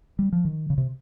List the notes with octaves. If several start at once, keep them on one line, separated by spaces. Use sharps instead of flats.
G3
F3
D#3
C#3
C3